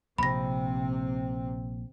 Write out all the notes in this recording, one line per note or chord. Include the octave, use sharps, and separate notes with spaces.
A#1 C3 C4 B5 A#6